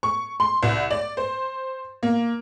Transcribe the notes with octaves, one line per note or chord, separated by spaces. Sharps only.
C#6
C6
C2
D5
C5
A#3